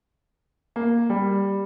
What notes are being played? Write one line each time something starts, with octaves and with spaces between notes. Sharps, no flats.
A#3
G3